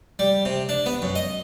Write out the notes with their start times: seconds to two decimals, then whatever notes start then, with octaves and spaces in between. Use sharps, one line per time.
0.19 G3
0.45 C3
0.69 D4
0.86 B3
1.02 F#2
1.15 D#5